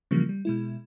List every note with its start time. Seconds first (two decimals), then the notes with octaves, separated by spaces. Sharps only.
0.11 C#3 E3 F3 G3 A#3
0.29 G3
0.45 B2 G#3 E4